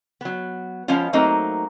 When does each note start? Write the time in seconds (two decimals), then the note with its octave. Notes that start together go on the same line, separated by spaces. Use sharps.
0.21 F#3 B3
0.88 F3 G#3 B3 C#4 F4
1.13 F#3 A3 A#3 C4 D#4